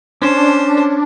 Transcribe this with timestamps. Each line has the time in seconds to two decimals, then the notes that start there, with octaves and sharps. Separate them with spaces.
0.22 C#4 D4 C5